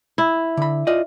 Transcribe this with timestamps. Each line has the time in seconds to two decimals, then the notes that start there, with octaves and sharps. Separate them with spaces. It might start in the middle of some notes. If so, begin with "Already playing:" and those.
0.18 E4
0.57 D3 B5
0.87 F4 D5 D#5